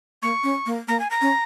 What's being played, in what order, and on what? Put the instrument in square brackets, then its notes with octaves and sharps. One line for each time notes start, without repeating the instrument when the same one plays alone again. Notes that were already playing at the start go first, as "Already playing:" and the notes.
[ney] A#3 [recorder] C#6
[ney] C#4
A#3
[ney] A#3 [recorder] A#5
[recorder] G#5
A#5
[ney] C#4